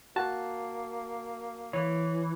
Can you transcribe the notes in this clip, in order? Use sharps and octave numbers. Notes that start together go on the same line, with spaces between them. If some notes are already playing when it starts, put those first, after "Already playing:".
A#3 F#4 A5
E3 C#5